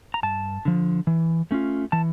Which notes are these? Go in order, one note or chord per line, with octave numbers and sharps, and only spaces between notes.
A#5
G2 A5
D3 F3
E3
A3 C#4 F4
E3 A5